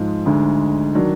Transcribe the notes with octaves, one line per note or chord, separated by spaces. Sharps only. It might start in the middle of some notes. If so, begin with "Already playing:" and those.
Already playing: G#2 F3 G#3
D2 D3 G#3 D#4
D#3 F#3 D4